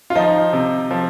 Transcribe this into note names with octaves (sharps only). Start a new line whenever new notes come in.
F4
F3 D#4
C3
F3